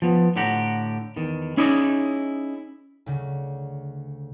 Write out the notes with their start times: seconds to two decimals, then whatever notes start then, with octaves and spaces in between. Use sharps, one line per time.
0.02 F3 B3
0.36 A2 D3 G4 F#5 A#5
1.16 E2 D#3
1.57 C#4 D#4 E4 G#4 D5 D#5
3.06 D2 C#3